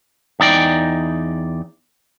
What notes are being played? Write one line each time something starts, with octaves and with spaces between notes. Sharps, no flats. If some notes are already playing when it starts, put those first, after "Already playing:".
E2 D#4 D5 G5